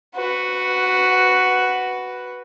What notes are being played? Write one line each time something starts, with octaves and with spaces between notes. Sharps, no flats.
F#4 B4